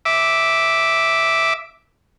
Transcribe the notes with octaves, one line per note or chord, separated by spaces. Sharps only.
E5 D6